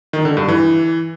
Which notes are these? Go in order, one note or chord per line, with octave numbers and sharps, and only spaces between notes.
D#3
D3
G2
E3